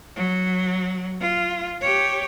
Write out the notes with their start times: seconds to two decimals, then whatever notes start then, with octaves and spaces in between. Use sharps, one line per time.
0.16 F#3
1.21 F4
1.81 G4 C#5